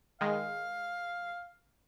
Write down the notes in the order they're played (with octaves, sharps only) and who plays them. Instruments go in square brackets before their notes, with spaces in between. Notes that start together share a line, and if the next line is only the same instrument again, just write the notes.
[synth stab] D#3 G#3 [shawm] F5